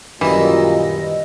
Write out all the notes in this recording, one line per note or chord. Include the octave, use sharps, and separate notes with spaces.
F#2 A#2 D#3 E3 G3 E4 D#5